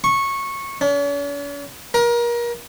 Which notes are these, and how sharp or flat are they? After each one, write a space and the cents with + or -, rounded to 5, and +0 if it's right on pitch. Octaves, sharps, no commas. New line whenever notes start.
C#6 -15
C#4 +45
A#4 +30